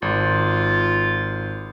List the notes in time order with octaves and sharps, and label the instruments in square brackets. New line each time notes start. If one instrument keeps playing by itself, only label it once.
[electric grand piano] G#1 [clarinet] F4